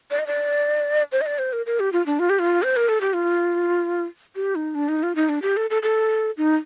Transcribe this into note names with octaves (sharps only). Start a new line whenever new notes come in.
D5
D#5
D5
C5
D#5
D5
C5
A#4
A#4
G4
F4
D4
F4
G4
F4
C5
A#4
A4
G4
F4
G4
D#4
D4
D#4
F4
D#4
D4
G4
A4
A4
A4
D#4